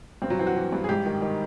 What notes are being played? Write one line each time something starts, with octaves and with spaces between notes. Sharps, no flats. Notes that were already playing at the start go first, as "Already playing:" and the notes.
G2 C4
F#3
E3 C4
F#4
E3
G2
G#4
G#2 G4
D#3
D#3